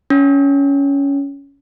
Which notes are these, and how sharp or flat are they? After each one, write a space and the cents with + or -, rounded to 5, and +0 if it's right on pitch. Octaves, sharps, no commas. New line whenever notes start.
C#4 +15